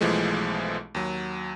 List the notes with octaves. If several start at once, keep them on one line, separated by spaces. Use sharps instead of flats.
B1 E3 F3 G#3 A3
D#2 F#3